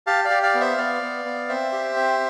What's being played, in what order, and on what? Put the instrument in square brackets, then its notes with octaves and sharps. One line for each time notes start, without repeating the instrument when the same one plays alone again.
[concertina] G4 F5 A5
D5 F5
G4
D5 F5
B3
C5 E5
B3 D5 F5
B3
B3
C4 C5 E5
G4
C4